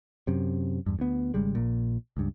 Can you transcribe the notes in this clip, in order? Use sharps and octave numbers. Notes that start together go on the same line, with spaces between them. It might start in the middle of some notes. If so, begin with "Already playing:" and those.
F#2 C3
E2 G2
D2 B3
G#1 C#3 G3 G#3
A#1 A#2
C#2 G2